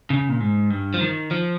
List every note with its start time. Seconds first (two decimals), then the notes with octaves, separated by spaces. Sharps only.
0.10 C#3
0.29 A#2
0.40 G#2
0.70 G2
0.94 F3
1.01 D#3
1.31 F3